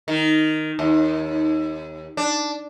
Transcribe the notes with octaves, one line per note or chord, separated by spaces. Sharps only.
D#3
D#2
D4